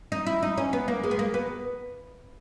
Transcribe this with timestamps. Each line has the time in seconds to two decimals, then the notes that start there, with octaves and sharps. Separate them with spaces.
0.12 D#4
0.26 E4
0.43 D#4
0.58 C#4
0.73 B3
0.88 A#3
1.03 G#3
1.11 B3
1.19 A#3
1.34 B3